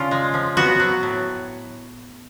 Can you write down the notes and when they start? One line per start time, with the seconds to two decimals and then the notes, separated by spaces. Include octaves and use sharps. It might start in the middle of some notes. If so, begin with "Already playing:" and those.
Already playing: C#3 D4 F4
0.11 G#3
0.34 F3
0.57 B3 F#4
0.80 F#3
1.03 A2